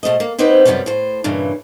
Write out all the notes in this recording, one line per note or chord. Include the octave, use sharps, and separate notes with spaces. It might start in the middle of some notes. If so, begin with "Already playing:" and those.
B2 A3 C5 D#5
A#3
B3 C4 D#4 G4 B4 C5
F#2 C3 D#3 G3 B3 C#4
A2 C5
G2 A#2 C#3 E3